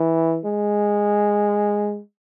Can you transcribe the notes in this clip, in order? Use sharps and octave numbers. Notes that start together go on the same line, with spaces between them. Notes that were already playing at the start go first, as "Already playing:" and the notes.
Already playing: E3
G#3